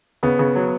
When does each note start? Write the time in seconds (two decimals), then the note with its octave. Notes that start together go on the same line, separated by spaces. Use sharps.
0.23 C#3 B3
0.39 C#3
0.55 F#3